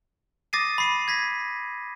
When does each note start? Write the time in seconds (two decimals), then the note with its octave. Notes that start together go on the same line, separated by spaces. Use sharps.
0.53 D6 D#6 A6 A#6 C7 D#7
0.78 B5 C7 D#7
1.08 G#6 A#6 B6